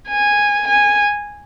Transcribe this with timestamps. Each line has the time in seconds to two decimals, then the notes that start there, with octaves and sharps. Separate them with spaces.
0.09 G#5
0.67 G#5